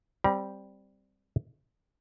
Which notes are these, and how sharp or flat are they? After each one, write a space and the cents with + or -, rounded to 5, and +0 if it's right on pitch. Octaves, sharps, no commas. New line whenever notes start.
G3 +0 C4 +0 A#5 +40